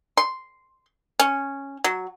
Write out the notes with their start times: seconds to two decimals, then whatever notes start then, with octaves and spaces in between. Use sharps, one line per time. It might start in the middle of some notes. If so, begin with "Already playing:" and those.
0.17 C6
1.20 C#4
1.84 F#3